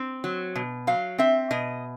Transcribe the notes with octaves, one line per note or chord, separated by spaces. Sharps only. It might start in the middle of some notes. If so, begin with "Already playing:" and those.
Already playing: C4
F#3
B2
F#3 F5
C4 E5
B2 D#5